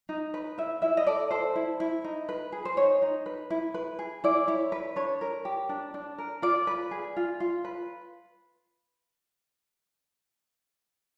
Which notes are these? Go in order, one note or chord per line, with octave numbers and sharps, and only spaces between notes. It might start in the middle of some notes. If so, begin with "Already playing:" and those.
D#4
B4
E4 E5
E4 E5
D#5
A4 D5
A4 C5
E4
E4
D#4
B4
G#4
C5
D#4 C#5
D#4
B4
E4
B4
G#4
E4 D5
E4 C#5
B4
D4 C#5
A#4
G4
D4
D4
A#4
F4 D5
B4
G#4
F4
F4
B4